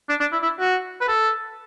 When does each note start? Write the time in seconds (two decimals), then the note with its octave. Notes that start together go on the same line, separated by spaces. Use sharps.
0.09 D4
0.20 D4
0.32 E4
0.42 E4
0.60 F#4
1.01 B4
1.08 A4